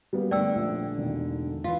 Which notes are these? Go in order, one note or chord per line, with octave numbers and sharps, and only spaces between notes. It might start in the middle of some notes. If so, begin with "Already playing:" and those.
G3 A#3 B3
D3 A3 D5 G5 E6
A#1
E1 D#3
E3 F4 F5